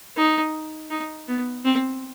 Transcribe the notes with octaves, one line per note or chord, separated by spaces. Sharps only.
D#4
D#4
B3
C4